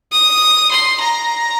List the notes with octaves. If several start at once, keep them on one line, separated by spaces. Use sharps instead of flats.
D#6
C6
A#5